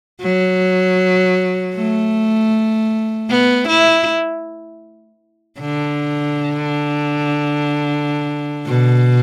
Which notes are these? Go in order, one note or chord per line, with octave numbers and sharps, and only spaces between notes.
F#3
A3
B3
E4
D3
B2